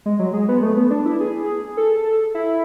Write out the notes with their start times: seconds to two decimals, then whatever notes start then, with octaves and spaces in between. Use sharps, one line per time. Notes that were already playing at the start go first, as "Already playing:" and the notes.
0.06 G#3
0.19 F#3
0.33 G#3
0.48 B3
0.62 A3
0.77 B3
0.91 D4
1.05 E4
1.20 G#4
1.77 A4
2.34 E4